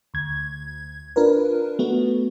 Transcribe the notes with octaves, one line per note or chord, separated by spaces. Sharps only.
D2 G#6
D4 F4 A#4 B4
A3 B3 F#4